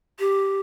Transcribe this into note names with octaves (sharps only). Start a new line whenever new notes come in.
G4